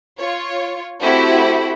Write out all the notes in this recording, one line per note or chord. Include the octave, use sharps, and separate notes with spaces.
F4 C#5
A3 C4 E4 F#4 G4